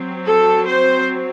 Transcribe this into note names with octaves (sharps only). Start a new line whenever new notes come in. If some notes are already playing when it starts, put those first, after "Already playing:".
Already playing: F#3 C4
A4
C5